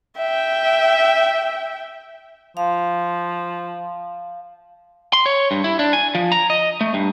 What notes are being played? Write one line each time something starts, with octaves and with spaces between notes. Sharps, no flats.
E5 G5
F3 F5
C6
C#5
G2
E4
D4
G#5
F3
A#5
D#5
A3
G2